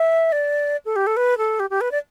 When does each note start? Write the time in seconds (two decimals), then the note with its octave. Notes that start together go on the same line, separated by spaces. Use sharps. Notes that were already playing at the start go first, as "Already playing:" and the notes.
Already playing: E5
0.32 D5
0.85 A4
0.96 G4
1.07 A4
1.17 B4
1.38 A4
1.60 G4
1.70 G4
1.81 B4
1.91 D5